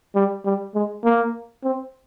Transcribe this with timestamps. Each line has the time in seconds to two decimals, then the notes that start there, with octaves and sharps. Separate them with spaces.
0.15 G3
0.45 G3
0.75 G#3
1.04 A#3
1.64 C4